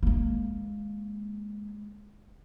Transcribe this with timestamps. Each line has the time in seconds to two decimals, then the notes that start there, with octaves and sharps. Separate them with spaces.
0.03 G#3 A#3